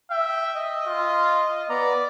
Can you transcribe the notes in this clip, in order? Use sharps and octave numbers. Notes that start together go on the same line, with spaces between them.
E5 G5
D#5
F4
B3 D5 A#5